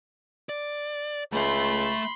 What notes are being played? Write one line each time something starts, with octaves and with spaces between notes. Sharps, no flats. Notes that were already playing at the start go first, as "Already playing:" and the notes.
D5
C#2 A3 E5 B5 C6